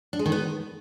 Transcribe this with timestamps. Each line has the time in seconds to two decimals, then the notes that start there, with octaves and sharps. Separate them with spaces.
0.13 D4
0.19 G#3
0.26 D#3
0.32 B3